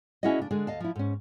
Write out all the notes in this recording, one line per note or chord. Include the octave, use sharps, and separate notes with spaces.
C#4 D4 E4 F#4 G#4 D#5
C#3 D4
D3 G#3 D4 G#4
D2 D#5 F5 A5
F3 E4
G#2 C#4